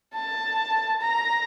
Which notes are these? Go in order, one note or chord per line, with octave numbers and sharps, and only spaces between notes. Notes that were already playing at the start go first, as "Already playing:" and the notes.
A5
A#5